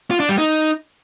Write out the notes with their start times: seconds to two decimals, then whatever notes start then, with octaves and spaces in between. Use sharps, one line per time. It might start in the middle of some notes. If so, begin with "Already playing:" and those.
0.11 F4
0.20 D4
0.29 G3
0.38 D#4